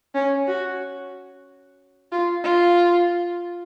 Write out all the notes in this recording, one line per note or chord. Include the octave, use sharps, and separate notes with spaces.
C#4
F#4
F4
F4